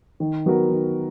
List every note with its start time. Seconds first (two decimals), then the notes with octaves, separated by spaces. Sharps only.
0.20 D#3
0.46 F#3 B3 F#4 A#4
0.71 D#3